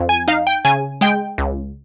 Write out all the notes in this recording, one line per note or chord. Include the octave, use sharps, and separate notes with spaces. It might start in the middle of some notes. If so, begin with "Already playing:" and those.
Already playing: F2
G#5
D#4 F5
G5
C#3 G#5
G#3 G5
C#2